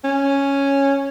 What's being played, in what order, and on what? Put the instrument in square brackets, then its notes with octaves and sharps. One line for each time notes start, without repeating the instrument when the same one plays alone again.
[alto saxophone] C#4